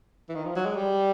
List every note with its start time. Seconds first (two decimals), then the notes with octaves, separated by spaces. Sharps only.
0.29 E3
0.35 D#3
0.45 F3
0.56 F#3
0.66 G#3
0.76 G3